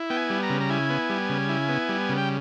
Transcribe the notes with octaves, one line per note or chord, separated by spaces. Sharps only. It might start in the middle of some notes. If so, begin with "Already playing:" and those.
Already playing: E4
B3 G5
G#5
G3
A#5
C#3
A#5
E4 G#5
B3
G3
C#3
E4
B3
G3
C#3
G5